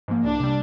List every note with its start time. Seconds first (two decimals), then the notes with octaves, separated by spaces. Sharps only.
0.08 G#2 F3 A#3
0.24 C2 D4
0.40 C3 G3